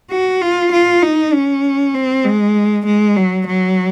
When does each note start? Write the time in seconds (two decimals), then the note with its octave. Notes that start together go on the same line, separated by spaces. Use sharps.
0.11 F#4
0.41 F4
0.72 F4
1.02 D#4
1.33 C#4
1.94 C4
2.25 G#3
2.86 G#3
3.16 F#3
3.47 F#3